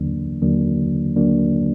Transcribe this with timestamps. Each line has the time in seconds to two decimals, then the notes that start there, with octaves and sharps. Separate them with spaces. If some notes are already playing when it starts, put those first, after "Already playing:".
Already playing: D#2 D3 F#3 A#3 D4
0.42 D#2 D3 F#3 A#3 D4
1.16 D#2 D3 F#3 A#3 D4